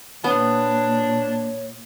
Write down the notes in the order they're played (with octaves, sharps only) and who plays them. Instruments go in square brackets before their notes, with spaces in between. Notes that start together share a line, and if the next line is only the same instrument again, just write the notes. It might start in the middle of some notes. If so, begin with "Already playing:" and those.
[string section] A#2 [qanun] B3 [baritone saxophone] D4 [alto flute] C#5